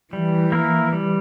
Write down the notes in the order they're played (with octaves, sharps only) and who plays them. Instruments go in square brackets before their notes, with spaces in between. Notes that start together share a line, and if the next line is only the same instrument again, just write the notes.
[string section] E3 [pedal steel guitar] G3
[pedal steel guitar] A#3 E4 A#4
G3